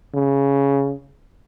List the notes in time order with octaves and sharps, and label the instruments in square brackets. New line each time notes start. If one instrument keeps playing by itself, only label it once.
[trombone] C#3